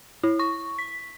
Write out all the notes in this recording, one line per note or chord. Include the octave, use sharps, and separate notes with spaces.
E4
C#6
B6